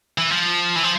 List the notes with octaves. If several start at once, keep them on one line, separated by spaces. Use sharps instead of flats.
E3
F3
E3
F3